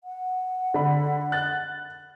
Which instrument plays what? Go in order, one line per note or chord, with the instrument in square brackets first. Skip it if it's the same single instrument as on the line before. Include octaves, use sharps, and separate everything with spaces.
[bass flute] F#5
[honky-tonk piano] D3 B5
F#6 A6